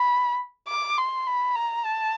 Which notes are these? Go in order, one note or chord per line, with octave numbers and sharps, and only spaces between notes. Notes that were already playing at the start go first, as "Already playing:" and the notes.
Already playing: B5
D6
C6
B5
A#5
A5